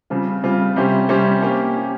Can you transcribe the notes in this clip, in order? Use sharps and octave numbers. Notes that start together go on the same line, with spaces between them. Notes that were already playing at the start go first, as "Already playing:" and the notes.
C#3 G3 C4 F4
C#3 G3 C4 F4
C3 G3 C#4 G4 C5
C3 G3 C#4 G4 C5
A#3 C#4 G4
A#3 C#4 G4